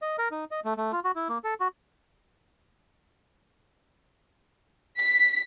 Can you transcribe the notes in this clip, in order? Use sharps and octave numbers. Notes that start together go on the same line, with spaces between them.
D#5
A#4
D#4
D#5
A3
A3
F4
F#4
E4
A#3
A4
F#4
B6